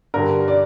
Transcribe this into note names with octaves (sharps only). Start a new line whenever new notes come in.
G2 D3 G3 A#4
D5